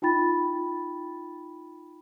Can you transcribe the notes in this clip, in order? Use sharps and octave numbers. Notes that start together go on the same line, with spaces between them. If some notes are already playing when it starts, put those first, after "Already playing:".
D#4 F4 G5 B5 A6